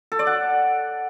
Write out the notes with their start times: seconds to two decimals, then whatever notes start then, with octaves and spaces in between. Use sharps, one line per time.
0.12 A4
0.19 D5
0.27 F#5